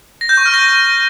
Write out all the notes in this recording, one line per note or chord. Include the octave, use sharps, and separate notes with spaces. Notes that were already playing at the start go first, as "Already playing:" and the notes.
A#6
G6
C#6
F6
A#6